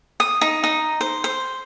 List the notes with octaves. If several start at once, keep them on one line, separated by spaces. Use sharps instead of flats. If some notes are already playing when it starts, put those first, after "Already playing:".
D#6
D#4
D#4
C5
C5